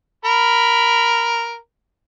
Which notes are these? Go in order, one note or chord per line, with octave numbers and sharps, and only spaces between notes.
A#4 B5